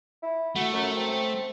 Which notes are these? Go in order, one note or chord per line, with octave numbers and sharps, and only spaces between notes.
E4
A3 F#4
F#2
C4